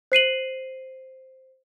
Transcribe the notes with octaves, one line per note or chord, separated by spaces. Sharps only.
C5 C7 D#7 F#7